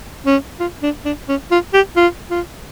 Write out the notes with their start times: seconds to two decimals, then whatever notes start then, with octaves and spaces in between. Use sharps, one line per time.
0.26 C#4
0.60 F4
0.83 D4
1.05 D4
1.29 C#4
1.51 F4
1.74 G4
1.96 F4
2.31 F4